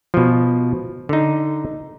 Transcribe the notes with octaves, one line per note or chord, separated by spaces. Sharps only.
B2 F3
D3 D#4